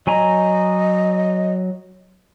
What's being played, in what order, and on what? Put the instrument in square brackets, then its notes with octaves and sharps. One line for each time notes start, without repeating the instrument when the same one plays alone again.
[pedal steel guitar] F#3 G#5 A#5 [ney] D#5